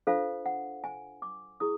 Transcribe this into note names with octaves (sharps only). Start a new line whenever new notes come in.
D4 F4 A4 C5 F5
F#5
G#5
D6
E4 G#4 D#6